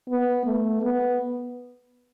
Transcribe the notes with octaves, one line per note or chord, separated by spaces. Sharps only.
B3
A3
B3